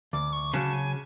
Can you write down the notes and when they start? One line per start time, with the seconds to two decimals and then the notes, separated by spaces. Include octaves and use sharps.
0.13 D2 D6
0.33 C#6
0.54 C#3 F#3 A5
0.73 G#5